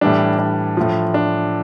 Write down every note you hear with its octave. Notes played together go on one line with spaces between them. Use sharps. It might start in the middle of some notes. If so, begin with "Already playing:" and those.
A2 E3 G3 D4
D4
A2 F3
D4